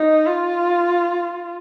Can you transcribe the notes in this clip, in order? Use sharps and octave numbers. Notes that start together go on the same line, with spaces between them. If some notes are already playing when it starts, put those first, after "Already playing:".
Already playing: D#4
F4